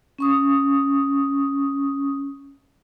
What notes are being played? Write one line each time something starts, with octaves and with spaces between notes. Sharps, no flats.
C#4 C#6 D#6